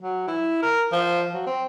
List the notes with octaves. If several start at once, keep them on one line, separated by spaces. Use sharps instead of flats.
F#3
E4
A#4
F3
F#3
C4